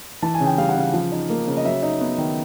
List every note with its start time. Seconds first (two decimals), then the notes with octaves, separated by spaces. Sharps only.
0.22 E3 A5
0.34 G#5
0.40 C#3
0.46 G5
0.58 G3 F5
0.69 F#5
0.76 C#3 F5
0.93 F3
1.12 D#4
1.30 A#3
1.47 C#3
1.57 D#5
1.65 F#3 E5
1.83 D#4
2.01 B3
2.18 D#3